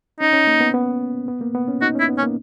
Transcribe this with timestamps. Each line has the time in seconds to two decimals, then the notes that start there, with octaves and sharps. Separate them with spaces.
0.20 C#4 D#4
0.33 C#4
0.47 A#3
0.61 B3
0.74 B3
1.28 B3
1.41 A#3
1.55 B3
1.68 C#4
1.82 D#4 F#4
1.95 C#4
2.00 E4
2.09 B3
2.18 C#4
2.23 A#3